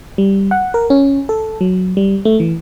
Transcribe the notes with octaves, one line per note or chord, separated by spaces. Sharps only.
G3
F#5
A#4
C#4
A4
F#3
G3
A3
E3